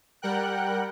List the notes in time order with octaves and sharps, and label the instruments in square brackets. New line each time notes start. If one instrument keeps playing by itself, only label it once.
[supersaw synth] G3 A#4 F#5 G5 F#6